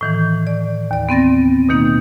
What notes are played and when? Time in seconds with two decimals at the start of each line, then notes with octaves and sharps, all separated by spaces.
0.01 A2 D#3 E3
0.47 D5
0.91 D#2 D5
1.09 B3 C4 A6 A#6
1.69 B2 D#3 A#3 D#4